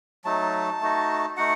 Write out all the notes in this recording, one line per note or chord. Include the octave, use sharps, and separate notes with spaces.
F#3 A3 D#4 A5
A3 D#4 F#4
A3 D#4 F#4 F#5